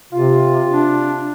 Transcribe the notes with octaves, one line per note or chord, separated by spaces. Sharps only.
C3 F4
D4